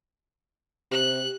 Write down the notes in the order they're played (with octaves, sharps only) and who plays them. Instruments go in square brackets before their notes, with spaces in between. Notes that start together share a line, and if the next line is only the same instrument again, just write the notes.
[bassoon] C3 [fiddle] F#6